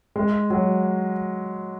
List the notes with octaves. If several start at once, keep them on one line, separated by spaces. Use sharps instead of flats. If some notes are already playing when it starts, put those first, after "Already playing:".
G#3
F#3